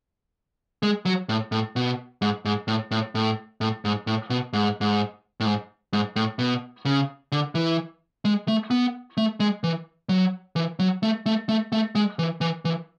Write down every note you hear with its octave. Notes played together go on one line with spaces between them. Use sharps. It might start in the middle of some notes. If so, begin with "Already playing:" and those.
G#3
F#3
A2
A2
B2
G#2
G#2
A2
A2
A2
A2
G#2
A2
B2
G#2
G#2
A2
G#2
G#2
A2
B2
C#3
D3
E3
G#3
A3
B3
A3
G#3
E3
F#3
E3
F#3
A3
A3
A3
A3
G#3
E3
E3
E3